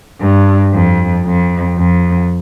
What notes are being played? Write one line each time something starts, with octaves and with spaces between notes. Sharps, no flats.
G2
F2
F2
F2